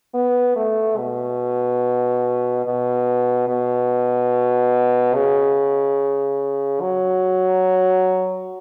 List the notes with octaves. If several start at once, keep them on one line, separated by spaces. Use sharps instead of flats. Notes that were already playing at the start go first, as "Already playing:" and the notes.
B3
A3
B2
B2
B2
C#3
F#3